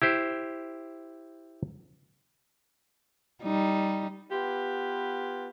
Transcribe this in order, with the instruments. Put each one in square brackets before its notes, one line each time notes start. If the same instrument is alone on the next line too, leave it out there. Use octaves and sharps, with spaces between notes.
[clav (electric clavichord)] E4 G4 C5
[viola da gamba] G3 D#4
[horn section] B3 F4 G4 B4